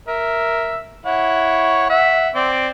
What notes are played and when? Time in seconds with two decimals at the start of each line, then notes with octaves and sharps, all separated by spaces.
0.08 A#4 E5
1.06 E4 C#5 F#5
1.90 E5 F#5
2.35 C4 D5